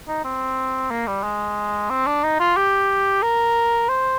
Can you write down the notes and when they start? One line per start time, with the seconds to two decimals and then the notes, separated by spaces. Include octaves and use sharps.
0.08 D#4
0.24 C4
0.91 A#3
1.07 G3
1.24 G#3
1.90 C4
2.06 D4
2.24 D#4
2.40 F4
2.57 G4
3.22 A#4
3.89 C5